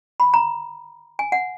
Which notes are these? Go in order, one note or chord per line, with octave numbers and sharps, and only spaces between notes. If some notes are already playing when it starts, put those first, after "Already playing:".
B5
A#5
G#5
F#5